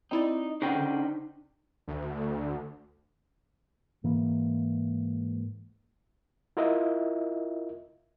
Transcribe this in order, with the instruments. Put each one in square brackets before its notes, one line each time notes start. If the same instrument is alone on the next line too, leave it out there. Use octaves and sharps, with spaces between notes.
[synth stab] C4 E4 D5 [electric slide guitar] D#4
[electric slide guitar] C#3 C5 F#5 [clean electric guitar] D4 D#4 G5
[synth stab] D3
[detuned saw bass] D2
[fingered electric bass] G#2 E3 A#3
[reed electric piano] E4 F4 A#4 D#5 E5